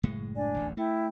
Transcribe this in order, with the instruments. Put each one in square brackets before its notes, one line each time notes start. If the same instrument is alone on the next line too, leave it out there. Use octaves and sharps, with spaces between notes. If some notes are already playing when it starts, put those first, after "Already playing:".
[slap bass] F#1 A2 G#3
[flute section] D4 D5 G#5
[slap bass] D1 A1 E2
[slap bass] A3 [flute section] E4 G5